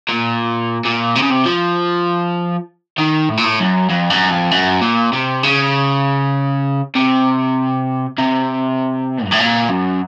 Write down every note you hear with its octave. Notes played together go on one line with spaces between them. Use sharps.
A#2
A#2
C3
C#3
C3
F3
D#3
A2
A#2
A2
F#2
F2
F#2
F2
F#2
A#2
C3
C#3
C3
C3
F#2
A2
A#2
F#2